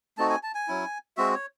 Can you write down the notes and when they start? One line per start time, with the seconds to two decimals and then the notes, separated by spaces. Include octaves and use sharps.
0.18 A3 C4 D#4 F#4 A5
0.30 G#5
0.43 A5
0.55 G#5
0.68 F#3 C#4 E4
1.17 G#3 C4 F#4 E5
1.35 C#5